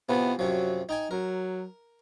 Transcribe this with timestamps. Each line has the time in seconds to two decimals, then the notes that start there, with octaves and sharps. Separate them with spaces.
0.09 C3 E3 F3 B3
0.39 F#2 C3 F3 F#3
0.89 D#4 G5 G#5
1.11 F#3 A#4